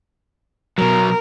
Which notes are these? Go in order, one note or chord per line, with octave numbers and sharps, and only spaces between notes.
B2 F#3 A#4